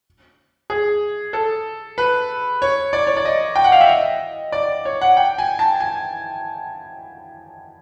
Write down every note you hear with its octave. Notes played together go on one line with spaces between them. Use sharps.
G#4
A4
B4
C#5
D5
C#5
D5
D#5
G5
F#5
F5
E5
D#5
D5
C#5
F#5
G5
G#5
A5
G#5